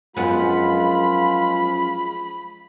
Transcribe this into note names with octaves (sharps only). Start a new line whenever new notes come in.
F#2 F3 G#3 B3 F4 B5